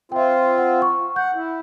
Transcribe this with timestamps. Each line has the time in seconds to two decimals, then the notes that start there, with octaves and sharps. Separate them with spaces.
0.12 C4 F4 E5 G5
0.58 F#5
0.82 C#6
1.16 F#5 G6
1.34 E4